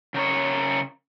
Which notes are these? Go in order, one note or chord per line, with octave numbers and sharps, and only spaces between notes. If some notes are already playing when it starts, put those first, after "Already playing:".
C#3 A#4 C#5